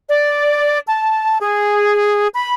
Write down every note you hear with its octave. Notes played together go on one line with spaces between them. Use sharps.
D5
A5
G#4
B5